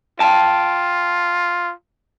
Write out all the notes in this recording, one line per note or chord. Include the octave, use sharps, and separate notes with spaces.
F4 G5 A5